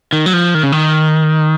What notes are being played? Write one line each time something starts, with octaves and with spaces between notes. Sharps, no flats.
D#3
F#3
F3
D#3
C#3
D#3